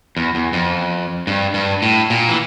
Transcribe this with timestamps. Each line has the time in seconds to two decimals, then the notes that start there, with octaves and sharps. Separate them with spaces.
0.17 E2
0.35 E2
0.53 F2
1.27 G2
1.54 G2
1.82 A2
2.10 A#2
2.29 E3